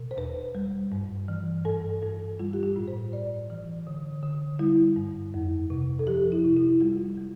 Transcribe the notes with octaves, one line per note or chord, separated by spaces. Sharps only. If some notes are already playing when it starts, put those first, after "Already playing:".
Already playing: B2
C5
E2 B4
G3
G2
E3
G2 A4
G2 A4
G3 F4
G4
F4
A2
C5
A2 D5
E3
D3
D3
G3 E4
G2
F2
C3
A4
F3 G4
E4
C3
E4
G3 F4
G3